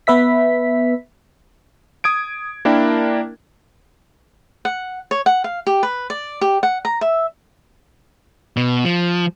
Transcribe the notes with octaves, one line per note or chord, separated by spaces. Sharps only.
B3 B4 E5 B6
D#6 G#6 D7
A#3 D4 E4 A#4 G5
F#5
C#5
F#5
F5
G4
B4
D5
G4
F#5
A#5
E5
B2
F3